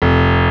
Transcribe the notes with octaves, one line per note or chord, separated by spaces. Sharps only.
F1